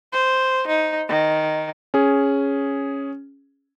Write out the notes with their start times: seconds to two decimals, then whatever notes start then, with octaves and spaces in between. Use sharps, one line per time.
0.13 C5
0.67 D#4
1.09 D#3
1.94 C#4 G#4